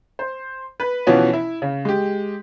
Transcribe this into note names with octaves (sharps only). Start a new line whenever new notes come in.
C5
B4
B2 E3 F3 B3 C#4
E4
C#3
G#3 G4